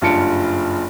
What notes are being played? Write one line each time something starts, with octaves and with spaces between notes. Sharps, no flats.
F#1 G2 F4 A5 C#7 D7